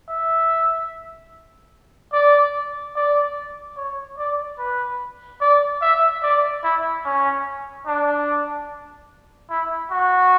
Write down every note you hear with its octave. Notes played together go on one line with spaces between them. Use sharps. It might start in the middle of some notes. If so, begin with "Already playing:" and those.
E5
D5
D5
C#5
D5
B4
D5
E5
D5
E4
C#4
D4
E4
F#4